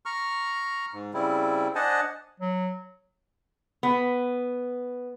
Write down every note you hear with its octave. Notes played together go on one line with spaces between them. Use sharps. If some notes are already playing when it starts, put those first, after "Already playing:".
A#5 C#6 F6
G#2
C#3 G3 C4 E4
D4 C5 D#5 F#5 G#5 A5
F#3
B3